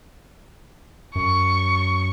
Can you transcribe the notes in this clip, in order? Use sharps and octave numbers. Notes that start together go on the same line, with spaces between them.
F#2 C#6